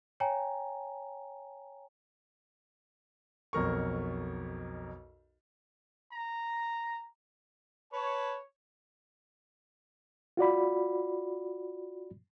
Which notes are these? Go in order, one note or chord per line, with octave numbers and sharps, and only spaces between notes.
C#5 G5 G#5 A#5
B1 F2 A#4 C#6
A#5
B4 C#5 A5
F4 F#4 D5 B5